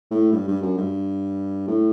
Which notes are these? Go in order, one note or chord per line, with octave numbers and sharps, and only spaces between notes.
A2
G2
G2
F#2
G2
A2